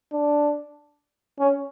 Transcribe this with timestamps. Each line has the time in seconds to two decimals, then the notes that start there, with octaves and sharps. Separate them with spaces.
0.13 D4
1.39 C#4